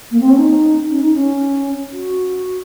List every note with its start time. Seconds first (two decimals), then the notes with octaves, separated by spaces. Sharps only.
0.11 A#3
0.20 C4
0.29 C#4
0.37 D#4
0.89 C#4
1.01 D#4
1.13 C#4
1.92 F#4